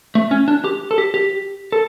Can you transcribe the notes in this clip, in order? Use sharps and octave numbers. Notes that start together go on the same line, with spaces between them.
A3
C#4
D4
G4
A4
G4
G4
A4